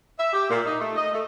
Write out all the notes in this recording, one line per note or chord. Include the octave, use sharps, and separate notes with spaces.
E5
G4
A#2
D#4
A3
D#5
A3